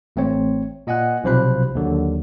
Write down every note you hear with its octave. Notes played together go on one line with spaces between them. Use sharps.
A1 A3 C4 C#5
A#2 D#5 F#5 G#5 F#6
B1 C3 F3 C5 B5 F#6
D#2 D3 F#3